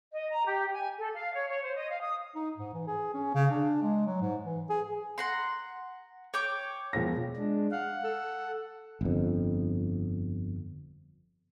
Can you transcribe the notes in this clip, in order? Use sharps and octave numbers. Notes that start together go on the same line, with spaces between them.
D#5
A#5
G4
G#5
A4
F5
C#5
C#5
C5
D#5
F5
D#6
D#4
G#2
E3
G#4
C#4
C#3
D4
G#3
F#3
G#2
E3
G#4
F#5 A#5 C6
C#5 G5 D6
E1 F3 A#6
G#3 D4
F5 F#5
A4
G1 F2